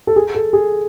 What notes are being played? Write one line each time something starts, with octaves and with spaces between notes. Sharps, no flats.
A4
G#4
A4
G#4